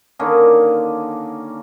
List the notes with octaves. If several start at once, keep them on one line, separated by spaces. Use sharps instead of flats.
D3 D#3 A#3 C#4